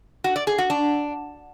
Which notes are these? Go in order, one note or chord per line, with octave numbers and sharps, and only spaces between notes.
F#4
D5
G#4
F#4
D4